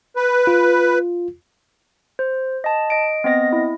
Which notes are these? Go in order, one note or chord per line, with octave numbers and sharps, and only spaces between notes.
B4
F4
C5
D#5 A5
D#5 D7
B3 C4 D#5 A#6
E4